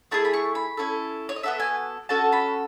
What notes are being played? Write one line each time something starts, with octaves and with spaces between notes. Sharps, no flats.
A3 E4 G#4 A5
B5
C#6
B5
C#4 E4 A4
C#5
D#5
B3 F#4 A4 E5
G#5
C#4 F#4 A4 A5
B5